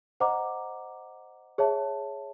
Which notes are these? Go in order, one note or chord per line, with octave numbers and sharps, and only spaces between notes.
C5 D#5 F#5 A#5 D6
G#4 C#5 E5 A5